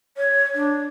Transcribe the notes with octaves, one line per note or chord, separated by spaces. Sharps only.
C#5
D4